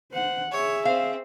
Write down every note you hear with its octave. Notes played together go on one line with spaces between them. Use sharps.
C5 F#5
G#4 C#5 E5
C4 F5